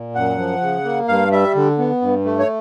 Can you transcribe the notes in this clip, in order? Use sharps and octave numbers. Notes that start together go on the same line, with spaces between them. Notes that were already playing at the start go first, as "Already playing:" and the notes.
Already playing: A#2
F#2 F#5
F3
C#3
A#3
G2 F5
G3 E5
D3
B3
G2
A3
C#5